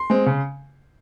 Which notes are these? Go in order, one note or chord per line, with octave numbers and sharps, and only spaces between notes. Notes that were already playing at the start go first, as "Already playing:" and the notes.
Already playing: C6
G#3 C4
C#3